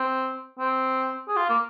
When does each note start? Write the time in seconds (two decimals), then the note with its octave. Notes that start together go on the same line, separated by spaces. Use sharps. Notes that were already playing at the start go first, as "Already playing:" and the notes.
Already playing: C4
0.59 C4
1.28 G#4
1.36 F4
1.49 A#3